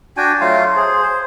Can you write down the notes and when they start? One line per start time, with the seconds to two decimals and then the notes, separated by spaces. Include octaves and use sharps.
0.17 D4 F#4 G5 G#5
0.41 F#3 A3 F4 F5
0.76 G#4 C5
1.02 C5